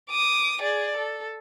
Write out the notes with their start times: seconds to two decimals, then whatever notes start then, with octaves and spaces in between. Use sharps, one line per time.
0.10 D6 D#6
0.62 G#4 D5
0.97 A4